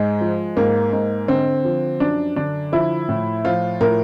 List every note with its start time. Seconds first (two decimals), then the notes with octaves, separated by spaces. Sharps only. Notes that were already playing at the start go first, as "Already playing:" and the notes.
Already playing: G#2 G#3
0.21 F3
0.57 G#2 A#3
0.93 G#2
1.28 D3 C4
1.64 F3
2.00 F#2 D4
2.36 D3 D4
2.72 F3 E4
3.09 A2
3.45 F3 F4
3.81 A2 A#4